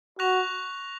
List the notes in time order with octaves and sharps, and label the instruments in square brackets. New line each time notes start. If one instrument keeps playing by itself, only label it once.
[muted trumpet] F#4 [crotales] C#6 F#6 A#6 F7